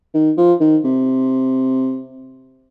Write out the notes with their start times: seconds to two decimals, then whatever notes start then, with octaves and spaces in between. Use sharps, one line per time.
0.14 D#3
0.37 F3
0.60 D#3
0.84 C3